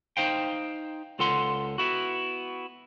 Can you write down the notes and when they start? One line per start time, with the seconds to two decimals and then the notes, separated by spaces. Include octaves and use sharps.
0.17 D#4 C5 F5 G5
1.19 C#2 F4 A4 F#5 C6
1.78 B3 E4 F#4